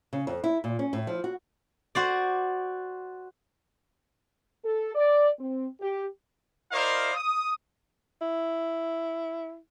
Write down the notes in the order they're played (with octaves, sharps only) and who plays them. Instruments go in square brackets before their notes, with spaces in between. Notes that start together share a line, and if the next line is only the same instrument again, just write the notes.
[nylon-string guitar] C#3
F2
E4
A#2
C#4
A2
F3
F#4
[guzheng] F#4 C5 D5
[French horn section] A4
D5
C4
G4
[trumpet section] E4 A#4 C5 D5 D#5 F5
D#6
[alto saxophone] E4